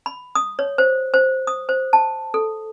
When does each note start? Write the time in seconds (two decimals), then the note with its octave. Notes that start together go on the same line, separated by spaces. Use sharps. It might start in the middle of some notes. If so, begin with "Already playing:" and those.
0.06 B5
0.35 D#6
0.59 C#5
0.78 C5
1.14 C5
1.47 D#6
1.69 C5
1.93 A5
2.34 A4